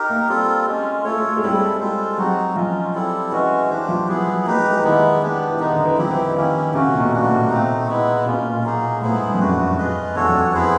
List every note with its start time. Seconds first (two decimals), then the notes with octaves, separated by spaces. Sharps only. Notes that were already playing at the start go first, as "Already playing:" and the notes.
Already playing: D#4 G4 A#4
0.10 A#3
0.29 G3 C4 F4 A4
0.66 G#3 C#4 F4
1.05 A3 F4 A4 C#5
1.17 A3
1.29 A3
1.37 G#3
1.42 G3 C4 E4 A4
1.52 G#3
1.80 G#3 F4 A4 C5
2.18 F#3 C4 D#4 F#4
2.56 F3 G#3 C#4 F4
2.94 G3 C4 E4 A4
3.32 E3 G#3 C#4 F#4
3.70 E3 D4 G4 C5
3.89 F3
4.08 F#3 B3 E4 G#4
4.27 F#3
4.46 A#3 D#4 G4 B4
4.58 G#3
4.71 G#3
4.78 E3
4.84 D#3 G#3 B3 E4
5.22 B3 D4 G4
5.50 E3
5.60 D#3 G#3 B3 D#4
5.73 D3
5.85 E3
5.98 F3 C4 E4 G4
6.11 E3
6.23 D#3
6.36 D#3 A#3 C#4 E4 G4
6.74 C#3 F#3 A3 C#4 F#4
6.87 C3
6.94 A#2
7.00 B2
7.12 A#2 G3 A#3 D4 F#4
7.24 A2
7.37 A#2
7.50 A3 C4 D#4
7.88 G#3 B3 E4
8.26 B2 A#3 C#4 F4
8.38 A#2
8.51 A#2
8.64 F#3 A#3 D#4 G#4
9.02 A2 B3 E4 G#4 C5
9.15 G#2
9.26 G2
9.34 F2
9.39 F#2 A3 D4 F#4 B4
9.78 F4 G#4 B4 D#5
10.15 E2 D4 F#4 A4 C#5
10.29 F2
10.54 B3 E4 G#4 C5